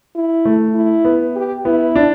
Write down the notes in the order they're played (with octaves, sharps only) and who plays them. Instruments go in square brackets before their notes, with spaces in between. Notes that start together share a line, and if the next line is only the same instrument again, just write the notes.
[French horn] E4
[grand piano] A3
[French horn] E4
[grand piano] B3
[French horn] G4
[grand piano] B3 [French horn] E4
[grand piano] D4